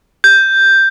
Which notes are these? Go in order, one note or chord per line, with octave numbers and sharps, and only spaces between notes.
G6